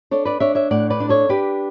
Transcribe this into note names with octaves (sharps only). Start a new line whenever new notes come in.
D4 A4 C#5
B4 D5
D4 C#5 E5
C#5 E5
A2 D5 F#5
B4 D5
D4
A4 C#5
D4 G4 B4